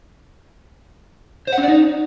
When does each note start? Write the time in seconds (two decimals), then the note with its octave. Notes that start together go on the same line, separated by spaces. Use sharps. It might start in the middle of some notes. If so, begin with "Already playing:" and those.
1.47 C5
1.53 F#5
1.58 C#4
1.63 D5
1.68 D#4